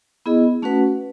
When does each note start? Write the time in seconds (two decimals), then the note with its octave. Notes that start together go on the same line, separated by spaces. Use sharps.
0.26 B3 E4 G#4 D#5
0.62 A3 C#4 F#4 B4 F#5